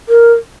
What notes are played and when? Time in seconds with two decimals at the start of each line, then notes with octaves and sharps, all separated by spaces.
0.09 A#4